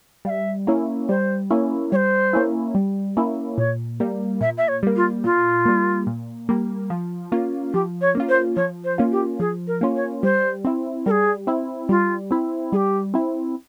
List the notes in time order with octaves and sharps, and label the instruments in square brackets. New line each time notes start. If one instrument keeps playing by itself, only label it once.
[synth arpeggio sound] G3 [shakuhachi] F5
[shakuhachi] E5
[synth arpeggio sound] A#3 C#4 E4
[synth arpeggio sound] G3 [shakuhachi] C5
[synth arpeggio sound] A#3 C#4 E4
[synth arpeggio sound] G3 [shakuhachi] C#5
[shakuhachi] C5
[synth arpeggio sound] A#3 C#4 E4
G3
A#3 C#4 E4
[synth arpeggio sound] A#2 [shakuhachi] C#5
[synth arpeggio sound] G3 A#3
[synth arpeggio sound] A#2 [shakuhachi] E5
[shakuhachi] E5
C#5
[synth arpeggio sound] G3 A#3
[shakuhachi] F4
[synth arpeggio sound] A#2 [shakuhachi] F4
[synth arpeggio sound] G3 A#3
A#2
G3 A#3
F3
A#3 C#4 F4
[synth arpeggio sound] F3 [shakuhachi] G4
[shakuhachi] C#5
[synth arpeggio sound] A#3 C#4 F4
[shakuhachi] C5
[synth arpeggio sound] F3 [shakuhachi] C#5
[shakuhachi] C5
[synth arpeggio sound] A#3 C#4 F4
[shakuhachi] G4
[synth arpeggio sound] F3 [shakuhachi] G#4
[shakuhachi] A#4
[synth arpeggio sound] A#3 C#4 F4
[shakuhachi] C#5
[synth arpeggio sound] G3 [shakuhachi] C5
[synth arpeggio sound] C4 E4
[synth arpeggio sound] G3 [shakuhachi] G#4 A#4
[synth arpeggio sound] C4 E4
[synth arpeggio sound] G3 [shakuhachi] F4
[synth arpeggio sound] C4 E4
[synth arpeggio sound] G3 [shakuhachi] G#4
[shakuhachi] G4
[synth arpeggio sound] C4 E4